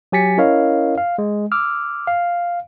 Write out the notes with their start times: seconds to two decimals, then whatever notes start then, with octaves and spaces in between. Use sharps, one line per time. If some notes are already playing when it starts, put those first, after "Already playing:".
0.12 F#3 G4 G#5 A6 B6 C#7
0.38 C#4 E4 A#4 C#5 D#5 F5
0.98 F5
1.18 G#3
1.52 D6 E6 F6
2.07 F5